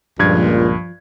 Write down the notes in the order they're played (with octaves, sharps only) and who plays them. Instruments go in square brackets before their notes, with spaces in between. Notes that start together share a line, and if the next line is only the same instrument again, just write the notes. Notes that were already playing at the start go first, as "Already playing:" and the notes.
[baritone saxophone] C#2 [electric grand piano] G2 G#6 [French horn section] A#2 [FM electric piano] F3